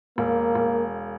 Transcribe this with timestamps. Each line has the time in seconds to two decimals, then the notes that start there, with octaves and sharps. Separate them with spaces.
0.18 E1 A#3
0.55 E1